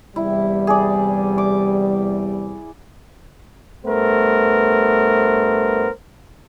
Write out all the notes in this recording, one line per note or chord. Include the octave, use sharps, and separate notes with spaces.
E2 C3 G3 E4
G#4 D5
D6
G2 A3 B3 A#4 C5